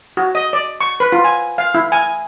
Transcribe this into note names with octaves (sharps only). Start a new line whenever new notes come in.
F#4
D#5
D5
C#6
B4
F4
G#5
F5
E4
G#5